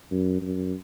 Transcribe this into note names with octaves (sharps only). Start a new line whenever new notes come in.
F#2
F#2